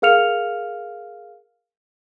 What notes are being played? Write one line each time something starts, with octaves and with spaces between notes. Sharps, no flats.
G#4 A#4 F5 F6 C#7 F7